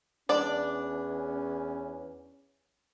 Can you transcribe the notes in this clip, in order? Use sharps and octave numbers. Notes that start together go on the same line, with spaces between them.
E2 C#4 D4 D5